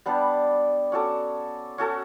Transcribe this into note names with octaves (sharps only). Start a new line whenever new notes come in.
G3 B3 D4 G4
C#4 F#4 A4 D5
C#4 F#4 A4